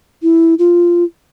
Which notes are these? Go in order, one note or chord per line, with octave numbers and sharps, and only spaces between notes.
E4
F4